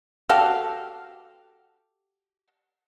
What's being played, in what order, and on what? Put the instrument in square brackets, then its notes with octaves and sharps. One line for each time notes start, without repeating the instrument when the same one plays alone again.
[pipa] F#4 G4 A4 F5